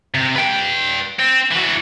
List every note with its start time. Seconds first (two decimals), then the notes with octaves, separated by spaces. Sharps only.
0.14 C3
0.36 B4 G5
1.19 C4
1.51 E3 F#4